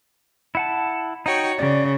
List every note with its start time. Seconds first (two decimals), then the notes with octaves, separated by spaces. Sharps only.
0.55 E4 F#5 A5
1.26 D#4 F#4 C#5 G5
1.59 C#3 D5